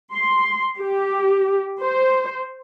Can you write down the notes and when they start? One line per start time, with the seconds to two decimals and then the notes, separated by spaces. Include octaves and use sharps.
0.14 C6
0.77 G4
1.81 C5